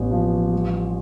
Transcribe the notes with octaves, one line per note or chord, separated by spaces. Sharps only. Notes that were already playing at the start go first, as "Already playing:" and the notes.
Already playing: A1 B3
F3
G3